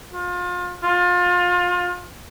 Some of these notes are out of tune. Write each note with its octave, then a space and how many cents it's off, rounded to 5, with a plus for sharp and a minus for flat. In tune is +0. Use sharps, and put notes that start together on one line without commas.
F4 +30
F4 +30